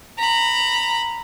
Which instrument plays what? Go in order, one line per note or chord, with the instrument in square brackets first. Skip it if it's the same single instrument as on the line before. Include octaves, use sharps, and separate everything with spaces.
[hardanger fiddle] A#5 B5